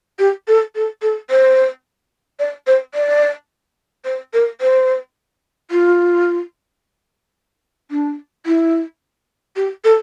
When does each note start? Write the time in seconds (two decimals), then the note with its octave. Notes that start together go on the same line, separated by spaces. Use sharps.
0.19 G4
0.47 A4
0.75 A4
1.02 A4
1.30 C5
2.39 D5
2.67 C5
2.94 D5
4.04 C5
4.33 A#4
4.61 C5
5.71 F4
7.91 D4
8.46 E4
9.56 G4
9.84 A4